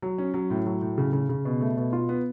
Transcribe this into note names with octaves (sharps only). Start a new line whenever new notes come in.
F#3
C#4
F#3
A2
F#3
A2
C#3
C#3
C#3
B2
A3
B2
F4
B3